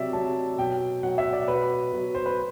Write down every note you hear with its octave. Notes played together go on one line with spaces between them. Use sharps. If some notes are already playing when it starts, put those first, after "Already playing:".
Already playing: C3 F#3 D5 E5
C3 F#3 A5
B2 F#3 G5
B2 F#3 F#5
E5
D5
B2 F#3 B4
B2 F#3
C5
B4